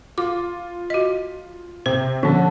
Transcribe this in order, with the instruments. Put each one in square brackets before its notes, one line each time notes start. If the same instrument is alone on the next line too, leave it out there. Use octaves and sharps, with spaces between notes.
[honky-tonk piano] F4 [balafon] D6
[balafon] F#4 D#5
[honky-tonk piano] C3 [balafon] C5
[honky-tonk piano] D3 A5 [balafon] F3 C#4